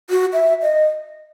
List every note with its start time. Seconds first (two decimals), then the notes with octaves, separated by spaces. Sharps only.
0.10 F#4
0.33 E5
0.62 D#5